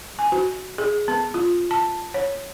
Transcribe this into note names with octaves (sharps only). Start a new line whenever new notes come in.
G#5
F#4
G#4
B3
F4
A5
C#5